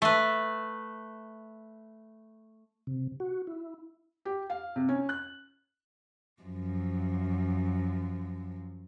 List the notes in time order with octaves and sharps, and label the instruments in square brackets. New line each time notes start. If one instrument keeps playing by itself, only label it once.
[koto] A3 B4
[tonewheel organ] C3
F#4
E4
[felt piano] G4
F5
C3
C#4
F#6
[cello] F#2 F3